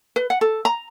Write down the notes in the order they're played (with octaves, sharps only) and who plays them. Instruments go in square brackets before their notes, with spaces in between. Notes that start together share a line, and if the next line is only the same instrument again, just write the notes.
[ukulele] B4
F#5
A4
A#5